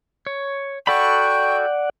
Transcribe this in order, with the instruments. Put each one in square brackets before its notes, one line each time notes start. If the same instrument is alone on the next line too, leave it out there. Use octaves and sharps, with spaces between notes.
[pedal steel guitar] C#5
[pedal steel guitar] F#4 A4 B5 [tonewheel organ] D5 F#5 [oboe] G5 [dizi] C#6